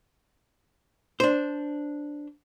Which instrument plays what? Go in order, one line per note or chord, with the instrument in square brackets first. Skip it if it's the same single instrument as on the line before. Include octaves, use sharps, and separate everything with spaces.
[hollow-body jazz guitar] D4 C5